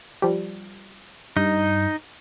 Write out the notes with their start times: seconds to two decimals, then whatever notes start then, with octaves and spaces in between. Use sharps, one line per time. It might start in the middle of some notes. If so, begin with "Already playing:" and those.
0.22 F3 G3
1.37 G2 D#4